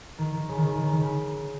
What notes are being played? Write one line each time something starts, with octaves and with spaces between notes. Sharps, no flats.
D#3
D#3
C#3
D#3
C#3
D#3
C#3
D#3
C#3